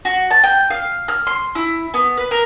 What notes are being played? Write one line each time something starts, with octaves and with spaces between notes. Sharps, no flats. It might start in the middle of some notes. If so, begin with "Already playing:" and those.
F#4
A5
G5
F5
F6
C6
E4
B3
B4
A#4